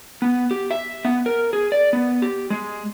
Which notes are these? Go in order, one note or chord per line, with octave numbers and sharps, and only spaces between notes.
B3
G4
E5
B3
A#4
G#4
D5
B3
G4
G#3